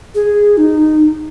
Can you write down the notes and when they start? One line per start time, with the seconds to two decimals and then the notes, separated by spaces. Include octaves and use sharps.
0.15 G#4
0.57 D#4